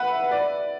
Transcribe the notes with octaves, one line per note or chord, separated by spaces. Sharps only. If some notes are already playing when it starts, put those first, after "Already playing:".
Already playing: B4 E5 F#5
D5